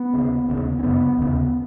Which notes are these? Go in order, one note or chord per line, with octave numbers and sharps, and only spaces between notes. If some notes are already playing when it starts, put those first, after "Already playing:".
Already playing: B3
D#2 C#3
D#2 C#3
C#4
F#2 C#3 B3
D#2 C#3